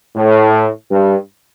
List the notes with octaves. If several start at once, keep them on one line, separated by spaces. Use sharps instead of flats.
A2
G2